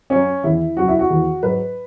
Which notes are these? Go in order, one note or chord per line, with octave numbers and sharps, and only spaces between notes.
F#2 F#3 C#4
E2 E3 E4
F#2 C#3 F#3 F#4
E4
F#4
E2 E3
G#2 F#3 B4